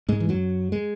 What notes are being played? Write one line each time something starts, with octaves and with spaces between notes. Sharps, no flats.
G#2 G#3
E3
F#2 F#3
G#3